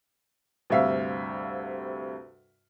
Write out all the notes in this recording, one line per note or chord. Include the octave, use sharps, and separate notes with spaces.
D2 G2 C3 E5 F5